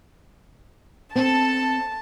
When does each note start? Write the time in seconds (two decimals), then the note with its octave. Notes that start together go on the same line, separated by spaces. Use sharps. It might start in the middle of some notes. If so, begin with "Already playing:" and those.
1.15 C4 A4 A5